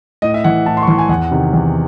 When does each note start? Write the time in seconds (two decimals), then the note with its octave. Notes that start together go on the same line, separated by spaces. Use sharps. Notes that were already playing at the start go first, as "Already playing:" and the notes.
0.22 A2 D#5
0.34 E5
0.44 E3 F#5
0.66 A2 A5
0.77 C6
0.82 C#6
0.87 E3 C6
0.98 G#5
1.09 E2 F#5
1.31 C3 D#3
1.53 E2